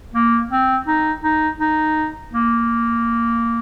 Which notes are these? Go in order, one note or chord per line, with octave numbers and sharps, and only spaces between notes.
A#3
C4
D#4
D#4
D#4
A#3